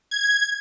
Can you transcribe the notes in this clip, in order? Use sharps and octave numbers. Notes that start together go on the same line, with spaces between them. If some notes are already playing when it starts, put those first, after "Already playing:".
G#6